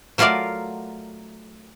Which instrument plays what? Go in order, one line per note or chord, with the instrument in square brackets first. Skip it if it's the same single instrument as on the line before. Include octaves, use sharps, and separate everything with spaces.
[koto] F#3 A3 F4 A#4 D5 F5